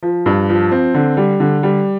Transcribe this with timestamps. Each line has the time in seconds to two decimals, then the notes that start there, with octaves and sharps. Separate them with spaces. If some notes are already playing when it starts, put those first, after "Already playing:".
0.03 F3
0.26 G2
0.49 F3
0.72 C4
0.94 D3
1.17 G3
1.40 D3
1.63 G3